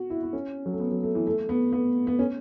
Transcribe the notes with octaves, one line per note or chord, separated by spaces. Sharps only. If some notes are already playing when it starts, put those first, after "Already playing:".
Already playing: F#4
E4
E4
C#4
F#3
A3
B3
F#3
A3
E3
A3
B3
B3
B3
C#4